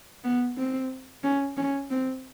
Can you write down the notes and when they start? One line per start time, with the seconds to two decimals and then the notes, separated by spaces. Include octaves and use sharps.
0.24 B3
0.57 C4
1.24 C#4
1.57 C#4
1.90 C4